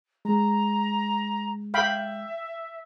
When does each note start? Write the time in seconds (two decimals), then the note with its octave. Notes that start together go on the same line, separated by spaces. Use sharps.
0.25 G#3 A#5
1.74 E5 F5 G5 B5